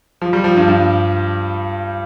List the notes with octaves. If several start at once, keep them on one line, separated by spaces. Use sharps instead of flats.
F3
G3
F3
G2
G2